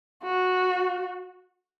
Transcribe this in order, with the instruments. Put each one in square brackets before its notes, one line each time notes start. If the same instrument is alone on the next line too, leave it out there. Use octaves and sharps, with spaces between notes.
[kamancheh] F#4